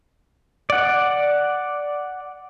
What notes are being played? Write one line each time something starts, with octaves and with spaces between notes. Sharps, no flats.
D5 F#5